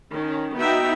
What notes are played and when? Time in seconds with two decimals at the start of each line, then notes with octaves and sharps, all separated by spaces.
0.13 D#3 C#4
0.58 B3 D#4 F#4 E5 G5